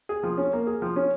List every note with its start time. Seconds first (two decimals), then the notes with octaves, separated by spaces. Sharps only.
0.09 G#4
0.23 F3
0.37 C#4
0.53 A#3
0.67 G#4
0.82 F3
0.96 C#4